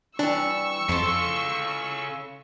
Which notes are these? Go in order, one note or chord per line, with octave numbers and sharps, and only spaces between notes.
E3 G3 D4 C#6 E6
F2 C#3 E4 F4 A4 C6